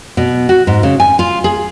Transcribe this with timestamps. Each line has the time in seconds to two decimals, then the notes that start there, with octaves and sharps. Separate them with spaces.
0.17 B2
0.49 F#4
0.67 G#2
0.83 C#3
1.00 G#5
1.19 F4
1.44 G#4